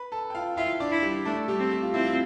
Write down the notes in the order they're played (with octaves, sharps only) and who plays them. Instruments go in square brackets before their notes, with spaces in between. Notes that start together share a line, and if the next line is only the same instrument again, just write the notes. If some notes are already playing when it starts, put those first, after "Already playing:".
Already playing: [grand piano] B4 B5
A4 A5
G5
F4 F5
[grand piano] E4 E5 [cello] F4
[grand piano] D4 D5
[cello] E4
[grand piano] G3 G4
[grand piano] A3 A4 [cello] D4
[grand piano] G3 G4
[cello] C4
[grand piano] G4
F4
[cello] C4 [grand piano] E4
[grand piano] F4